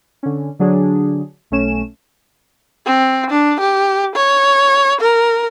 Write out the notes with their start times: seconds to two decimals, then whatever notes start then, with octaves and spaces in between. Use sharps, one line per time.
0.23 D3 C#4
0.59 D3 F#3 D4 G#4
1.51 B1 A3 C#4 E7
2.86 C4
3.30 D4
3.60 G4
4.15 C#5
5.01 A#4